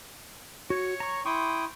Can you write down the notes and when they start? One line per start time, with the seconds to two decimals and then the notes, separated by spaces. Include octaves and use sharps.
0.70 F#4 C#5
1.00 A#5 C#6
1.26 E4 G5 C6 C#6 D#6